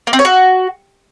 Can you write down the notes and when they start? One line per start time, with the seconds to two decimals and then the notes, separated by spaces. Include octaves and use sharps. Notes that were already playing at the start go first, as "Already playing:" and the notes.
0.07 A#3
0.13 C4
0.19 C#5
0.25 F#4